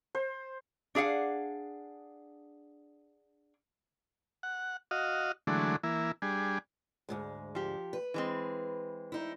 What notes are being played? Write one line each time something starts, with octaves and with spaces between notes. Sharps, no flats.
C5
D4 G#4 F5 F#5
F#5
F#4 D#5 F5
D3 E3 F#3 G#3 A3 D4
E3 A#3 E4
G3 D4 G#4
D2 G#2 G#3
F3 G4
B4
E3 G#3 C4
D#4 E4